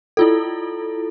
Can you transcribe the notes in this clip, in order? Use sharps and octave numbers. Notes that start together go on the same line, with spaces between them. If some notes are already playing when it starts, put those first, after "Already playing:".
E4 F4 A4